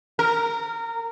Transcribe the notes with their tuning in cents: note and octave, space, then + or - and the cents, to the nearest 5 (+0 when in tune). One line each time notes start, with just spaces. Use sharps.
A#4 -20